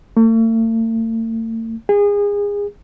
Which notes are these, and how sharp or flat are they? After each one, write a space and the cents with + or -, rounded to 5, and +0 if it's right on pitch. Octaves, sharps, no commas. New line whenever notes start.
A3 +45
G#4 -30